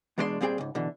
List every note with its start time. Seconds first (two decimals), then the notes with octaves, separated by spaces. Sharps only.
0.18 E2 B2 G#3 D4 B4 C6
0.41 A#2 G3 C4 G#4 G5
0.58 C#2 G#2
0.75 B2 D3 E3